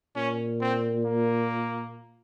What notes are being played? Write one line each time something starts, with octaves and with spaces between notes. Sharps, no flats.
A#2 C#4
C4
A#3